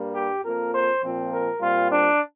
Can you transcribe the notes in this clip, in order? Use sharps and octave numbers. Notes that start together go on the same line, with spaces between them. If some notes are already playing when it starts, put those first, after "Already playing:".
Already playing: G2 G3 A#3
G4
F2 F3 A#3 A#4
C5
A#2 F3 C4
A#4
A#2 G3 C4 F4
D4